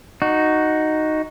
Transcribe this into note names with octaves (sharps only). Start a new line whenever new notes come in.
D#4 F#4